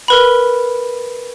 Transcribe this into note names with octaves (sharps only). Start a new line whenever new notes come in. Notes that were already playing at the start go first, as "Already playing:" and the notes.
A#4 B4 B5